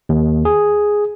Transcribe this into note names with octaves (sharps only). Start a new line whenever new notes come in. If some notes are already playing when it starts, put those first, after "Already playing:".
D#2
G#4